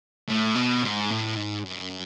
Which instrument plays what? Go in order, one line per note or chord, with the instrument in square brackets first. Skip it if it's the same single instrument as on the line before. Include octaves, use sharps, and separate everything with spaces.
[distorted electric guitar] A2
B2
G#2
A2
G#2
F#2